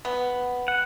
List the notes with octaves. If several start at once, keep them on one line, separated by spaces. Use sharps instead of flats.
B3
F#5